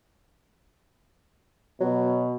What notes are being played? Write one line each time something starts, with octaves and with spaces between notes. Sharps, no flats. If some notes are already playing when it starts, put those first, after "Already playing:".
B2 F#3